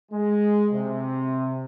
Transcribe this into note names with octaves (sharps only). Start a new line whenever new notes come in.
G#3
C3